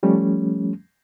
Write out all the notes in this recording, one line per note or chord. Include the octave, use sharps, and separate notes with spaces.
F3 G3 A3 C#4